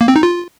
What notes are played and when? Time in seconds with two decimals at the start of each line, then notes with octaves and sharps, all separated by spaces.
0.01 A#3
0.08 C4
0.16 D#4
0.23 F4